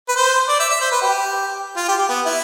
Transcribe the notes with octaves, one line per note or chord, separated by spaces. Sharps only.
B4
C5
D5
E5
E5
C5
B4
G4
F4
G4
G4
B3
E4